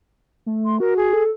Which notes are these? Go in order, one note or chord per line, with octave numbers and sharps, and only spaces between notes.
A3
C6
F#4 A#4
G#4
A4